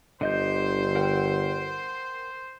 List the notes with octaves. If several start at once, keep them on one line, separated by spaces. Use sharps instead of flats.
G1 D3 C5 D#5 G6
A#4 F#5 G5